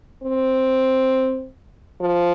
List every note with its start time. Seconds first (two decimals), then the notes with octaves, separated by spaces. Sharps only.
0.23 C4
2.01 F3